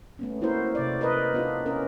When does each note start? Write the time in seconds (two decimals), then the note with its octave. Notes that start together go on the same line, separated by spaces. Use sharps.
0.19 A3 B3 C#4
0.41 A#3 E4 F#4 A#4 C5
0.75 C3 D5
1.01 A#4 B4 D5 D#5
1.34 B3 D4 F4
1.66 C#4 A#4